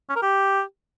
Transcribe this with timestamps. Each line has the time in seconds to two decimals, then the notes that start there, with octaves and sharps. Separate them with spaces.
0.09 C#4
0.16 A#4
0.22 G4